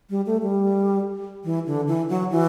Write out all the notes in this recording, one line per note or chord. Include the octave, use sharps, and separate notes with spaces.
G3
A3
G3
E3
D3
E3
F#3
E3